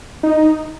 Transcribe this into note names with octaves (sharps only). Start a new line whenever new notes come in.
D#4